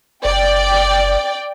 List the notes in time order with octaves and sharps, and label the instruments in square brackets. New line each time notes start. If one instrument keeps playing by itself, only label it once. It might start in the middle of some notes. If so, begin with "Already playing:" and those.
[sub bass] F#1 [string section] D5 G5